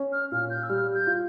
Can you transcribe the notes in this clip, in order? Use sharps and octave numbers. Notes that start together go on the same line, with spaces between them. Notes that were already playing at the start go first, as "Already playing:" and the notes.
Already playing: C#4
F6
A#2 F6
G6
E6
G3 F6
G6
F4